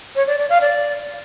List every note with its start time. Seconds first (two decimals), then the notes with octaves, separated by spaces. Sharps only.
0.16 C#5
0.27 D5
0.38 D5
0.50 F5
0.61 D5